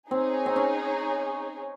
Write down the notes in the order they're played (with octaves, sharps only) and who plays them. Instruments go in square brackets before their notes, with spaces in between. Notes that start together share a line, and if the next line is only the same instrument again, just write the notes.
[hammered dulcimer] C4 [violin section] D#4 G#4 C#5
[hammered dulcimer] C4
C#4